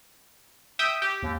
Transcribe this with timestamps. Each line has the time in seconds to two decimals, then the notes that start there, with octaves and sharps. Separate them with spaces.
0.79 E5 G5 D#6
1.02 G4
1.23 D#2